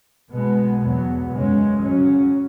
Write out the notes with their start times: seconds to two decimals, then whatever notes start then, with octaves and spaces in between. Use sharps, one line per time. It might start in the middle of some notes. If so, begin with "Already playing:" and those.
0.31 B2 G#3 B3
0.81 E2 B2 F#3 B3
1.32 F#2 C#3 G#3 C#4
1.82 C#3 F#3 C#4